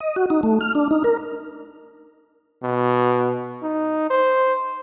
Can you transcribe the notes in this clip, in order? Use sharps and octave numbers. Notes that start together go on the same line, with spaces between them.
D#5
F#4
D#4
A3
F6
D4
D#4
A#4
B2
D#4
C5